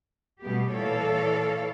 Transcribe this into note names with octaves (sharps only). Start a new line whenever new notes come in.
B2 G3 A3 B3 G4
A#2 E3 A4 C#5 D5 F5